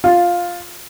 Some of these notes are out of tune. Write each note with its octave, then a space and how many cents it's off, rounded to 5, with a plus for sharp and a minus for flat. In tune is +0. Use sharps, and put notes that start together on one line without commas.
F4 +5